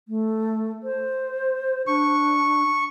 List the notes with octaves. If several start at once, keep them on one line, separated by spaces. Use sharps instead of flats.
A3
C5
D4 C#6